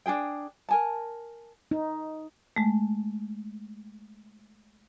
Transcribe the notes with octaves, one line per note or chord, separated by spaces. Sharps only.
D4 F#4 G#4 G5
A#4 G#5 A5
D#4
G#3 A3